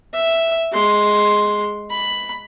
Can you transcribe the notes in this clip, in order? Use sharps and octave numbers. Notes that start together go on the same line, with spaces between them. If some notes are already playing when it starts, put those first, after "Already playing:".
E5
G#3 C6
B5